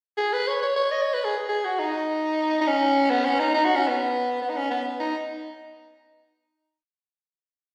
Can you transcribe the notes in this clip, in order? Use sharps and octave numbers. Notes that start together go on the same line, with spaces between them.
G#4
B4
C#5
C#5
C#5
D#5
C#5
B4
G#4
G#4
F#4
D#4
D#4
C#4
B3
C#4
D#4
D#4
F#4
C#4
B3
B3
D#4
C#4
B3
D#4